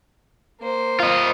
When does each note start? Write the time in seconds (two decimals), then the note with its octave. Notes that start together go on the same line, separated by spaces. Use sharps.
0.61 A#3 C5
1.00 F4 D#5